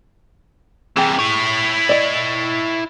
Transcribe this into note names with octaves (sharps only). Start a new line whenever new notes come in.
C3 E3 G4 G#4
E4 C#5
D5 D#5